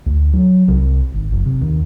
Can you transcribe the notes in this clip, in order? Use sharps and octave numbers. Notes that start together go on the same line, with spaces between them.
D2
F#3
C2
G#1
F#1
C3
D#2